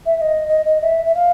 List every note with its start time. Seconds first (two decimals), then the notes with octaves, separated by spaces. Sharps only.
0.05 E5
0.16 E5
0.21 D#5
0.48 D#5
0.65 D#5
0.81 E5
1.05 E5
1.15 F5